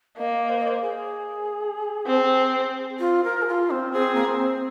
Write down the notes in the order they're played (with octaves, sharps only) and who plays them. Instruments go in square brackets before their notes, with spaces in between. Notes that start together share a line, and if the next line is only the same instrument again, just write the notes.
[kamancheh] A#3 [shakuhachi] D#5
[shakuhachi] C5
D#5
C5
G#4
[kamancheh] C4
[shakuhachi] F4
A#4
G#4
F4
C4
[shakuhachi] C4 [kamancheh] G#4
[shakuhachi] A#3
C4